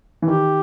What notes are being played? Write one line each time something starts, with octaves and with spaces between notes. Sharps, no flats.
E3
D#3 G4